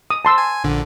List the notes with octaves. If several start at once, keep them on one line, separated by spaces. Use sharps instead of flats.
D#6
A5 C6 E6
G#5
A#1 D3